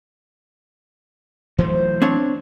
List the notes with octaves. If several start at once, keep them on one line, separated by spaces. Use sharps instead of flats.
E3 F#3 A3 C5
C4 D4 C#5